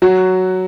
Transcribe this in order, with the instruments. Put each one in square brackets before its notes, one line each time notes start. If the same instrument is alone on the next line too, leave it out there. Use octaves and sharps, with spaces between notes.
[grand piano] F#3 F#4